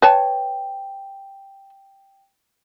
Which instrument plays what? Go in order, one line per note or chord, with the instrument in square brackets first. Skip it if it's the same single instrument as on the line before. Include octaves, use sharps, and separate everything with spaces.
[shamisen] B4 C#5 A5 [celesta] G5